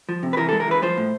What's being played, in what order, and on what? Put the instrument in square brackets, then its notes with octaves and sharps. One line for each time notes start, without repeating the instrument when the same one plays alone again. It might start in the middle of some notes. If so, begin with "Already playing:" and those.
[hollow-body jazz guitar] F3
C3
B4
E3 A#4
G#3 A4
A#4
E3 B4
F3 C5
A2